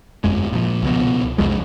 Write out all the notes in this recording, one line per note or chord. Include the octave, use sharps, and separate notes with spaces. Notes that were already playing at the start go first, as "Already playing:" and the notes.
G1 F2 G#3
A#2 F3
C#2 B2
C2 F2 F3 G#3